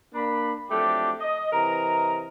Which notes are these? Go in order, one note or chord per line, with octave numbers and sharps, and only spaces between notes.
A#3 D4 B5
F3 F#3 A3 C4 D4 G4
D#5
C3 E3 A#4 D#5 A#5